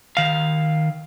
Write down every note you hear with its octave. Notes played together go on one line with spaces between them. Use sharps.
D#3 F5